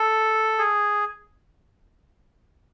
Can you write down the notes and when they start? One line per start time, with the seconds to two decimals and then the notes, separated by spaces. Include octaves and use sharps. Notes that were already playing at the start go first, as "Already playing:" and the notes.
Already playing: A4
0.59 G#4